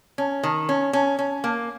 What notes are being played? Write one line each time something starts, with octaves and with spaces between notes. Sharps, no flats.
C#4
D#3
C#4
C#4
C#4
A#3